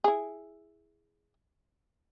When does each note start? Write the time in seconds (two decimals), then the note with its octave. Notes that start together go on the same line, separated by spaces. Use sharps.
0.04 E4 G#4